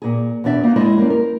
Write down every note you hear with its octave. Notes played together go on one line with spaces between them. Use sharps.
A#2 G#4
E2 B2 D4 D5 E5
A#3 D#4 F#4
G#3 E4 D5 D#5
F2 G3 A#3 C#4
A#4